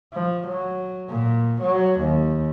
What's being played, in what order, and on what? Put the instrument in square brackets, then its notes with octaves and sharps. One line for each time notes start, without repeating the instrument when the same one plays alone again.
[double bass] F3
F#3
A#2
F#3
D#2